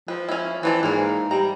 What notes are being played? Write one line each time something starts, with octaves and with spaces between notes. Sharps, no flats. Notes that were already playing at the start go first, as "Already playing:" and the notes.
F3 B4
C#4 E4
E3 C4 D4 D5
G#2 A#3 A#4
G3 A#5